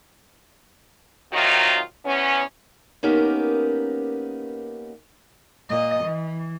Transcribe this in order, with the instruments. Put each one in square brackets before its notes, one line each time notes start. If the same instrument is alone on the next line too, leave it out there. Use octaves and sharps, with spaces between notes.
[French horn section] C3 D#3 F#3 D#4 F4
E2 B3 C#4
[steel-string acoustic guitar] A#3 B3 C#4 D#4 G4 A#4
[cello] A#2 D#5
E3